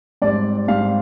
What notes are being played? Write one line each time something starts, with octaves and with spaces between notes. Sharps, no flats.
G#2 G3 C4 D5
G#2 G3 C4 F5